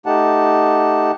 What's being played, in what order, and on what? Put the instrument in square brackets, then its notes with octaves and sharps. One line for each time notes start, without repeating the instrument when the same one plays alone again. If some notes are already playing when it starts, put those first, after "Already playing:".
[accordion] A3 D#4 G4 F#5 A5